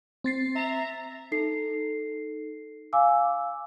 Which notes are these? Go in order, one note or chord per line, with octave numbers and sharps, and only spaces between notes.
C4 A6 C7
E5 A#5
D#4 A4 C7
F5 G#5 D6 E6